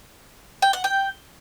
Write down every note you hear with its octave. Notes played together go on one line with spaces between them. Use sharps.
G5
F#5
G5